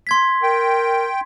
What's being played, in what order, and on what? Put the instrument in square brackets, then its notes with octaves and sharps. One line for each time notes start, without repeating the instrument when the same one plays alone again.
[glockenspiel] C6 G#6 B6
[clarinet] A#4 [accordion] G5